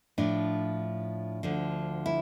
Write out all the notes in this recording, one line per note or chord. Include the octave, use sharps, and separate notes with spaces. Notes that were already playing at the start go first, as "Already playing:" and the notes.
A2 F3 D4
D2 D3 F3
E4